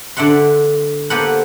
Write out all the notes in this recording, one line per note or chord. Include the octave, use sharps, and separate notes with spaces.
D3 D4 E5 F#5 C6
A#3 B3 G4 A4 C5 F#5